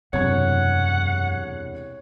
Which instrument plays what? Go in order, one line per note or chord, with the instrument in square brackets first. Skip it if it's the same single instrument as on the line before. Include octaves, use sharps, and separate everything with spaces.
[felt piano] E1 C2 G#6 [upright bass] F#2 [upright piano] C#5 [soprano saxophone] F#5